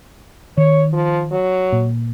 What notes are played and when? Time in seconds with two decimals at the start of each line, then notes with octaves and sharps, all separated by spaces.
0.58 D#3 C#5
0.93 F3
1.31 F#3
1.72 A#2